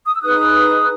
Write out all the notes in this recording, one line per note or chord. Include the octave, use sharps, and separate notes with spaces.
D#6
E6
D#4 G#4 B4 D#6 F#6